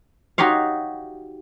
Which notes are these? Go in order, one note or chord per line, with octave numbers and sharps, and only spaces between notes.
D#4 F#4 G4 C#5 F5